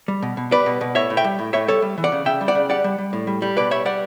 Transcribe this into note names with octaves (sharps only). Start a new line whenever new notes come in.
G3
B2
B2
G3 B4 D5
B2
B2
A2 C#5 E5
A2
E5 G5
G3
A2
A2 C#5 E5
G3 A4 C#5
G3
E3
D5 F#5
C#3
C#3 E5 G5
G3
D5 F#5
C#3
G3 D5 F#5
G3
G3
A2
G3
G3
B2 B4 D5
G3 C#5 E5
G3 D5 F#5